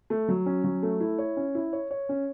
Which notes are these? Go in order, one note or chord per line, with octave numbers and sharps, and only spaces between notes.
A3
F#3
C#4
F#3
A3
E4
C#5
C#4
E4
C#5
C#5
C#4